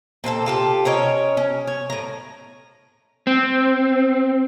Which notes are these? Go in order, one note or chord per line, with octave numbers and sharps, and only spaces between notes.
A#2 C4 E4 A4
F4 G4 A4
C#4 A#4 C#5 D#5
C#4
C#5
A2 A#5
C4